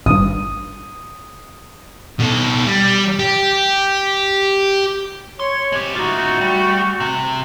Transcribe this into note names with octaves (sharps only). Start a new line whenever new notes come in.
G#1 G2 D#6
B2 A4
G3
G4
C#5 C6
G#3 G4
A3 D#4 F4 F#4
G3
C3